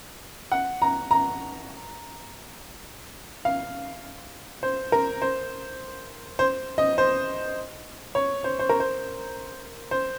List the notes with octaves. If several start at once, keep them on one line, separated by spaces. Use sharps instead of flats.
F#5
A#5
A#5
F5
C5
A#4
C5
C5
D#5
C5
C#5
C5
C5
A#4
C5
C5